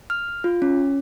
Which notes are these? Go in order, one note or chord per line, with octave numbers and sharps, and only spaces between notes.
F6
F4
C#4